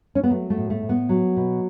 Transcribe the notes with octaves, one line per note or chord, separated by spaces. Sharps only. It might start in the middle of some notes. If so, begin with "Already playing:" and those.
C#4
B3
F#3 A3
A3
A2
A3
A2
B3
F#3
B2